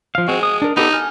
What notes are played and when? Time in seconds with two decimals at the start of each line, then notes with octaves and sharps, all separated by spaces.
0.15 F3 F5
0.28 G#3 C4 F#4
0.43 D#6
0.62 D4 A#4
0.77 B3 D#4 G4 A4
0.93 G#5 F6